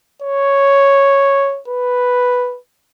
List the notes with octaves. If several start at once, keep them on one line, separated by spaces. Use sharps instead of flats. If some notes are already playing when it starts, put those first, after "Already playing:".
C#5
B4